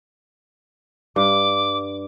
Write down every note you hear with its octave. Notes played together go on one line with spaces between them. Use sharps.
G2 D6